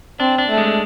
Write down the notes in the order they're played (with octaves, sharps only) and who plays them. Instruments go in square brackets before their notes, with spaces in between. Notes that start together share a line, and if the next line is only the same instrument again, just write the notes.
[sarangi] C4 [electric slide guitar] D4
[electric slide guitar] D4
[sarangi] A3
[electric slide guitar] G#3